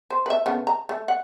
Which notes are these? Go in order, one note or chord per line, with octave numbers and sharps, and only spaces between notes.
C5
B4 E5
C#3 A3 B3
A#5
A3
F#5